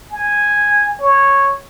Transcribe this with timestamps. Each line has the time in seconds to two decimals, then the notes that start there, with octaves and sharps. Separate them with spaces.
0.11 G#5
0.99 C#5